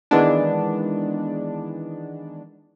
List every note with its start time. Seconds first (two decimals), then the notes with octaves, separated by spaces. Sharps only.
0.11 D#3 E3 G#3 B3 D4